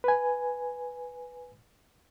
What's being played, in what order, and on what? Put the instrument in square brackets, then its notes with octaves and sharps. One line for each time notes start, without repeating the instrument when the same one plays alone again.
[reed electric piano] B4 G#5